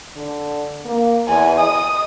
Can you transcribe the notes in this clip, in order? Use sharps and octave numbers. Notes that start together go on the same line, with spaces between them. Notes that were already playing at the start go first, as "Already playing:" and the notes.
D3
A#3
E2 G#5
D#5 D#6